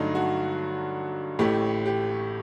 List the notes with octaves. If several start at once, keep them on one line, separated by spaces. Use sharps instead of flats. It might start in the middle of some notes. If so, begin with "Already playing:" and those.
Already playing: G2 D3 F#3 A3 D4 D#4
F#4
A1 A2 A3 G4
G4